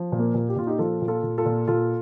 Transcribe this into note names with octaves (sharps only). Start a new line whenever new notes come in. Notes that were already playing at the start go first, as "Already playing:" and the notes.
Already playing: F3
A#2
A#3
A#2
G4
A#2 F4
D#4 G4
F3 F4 A4
A#2
F4 A4
A#2
F4 A4
A#2
A#2 F4 A4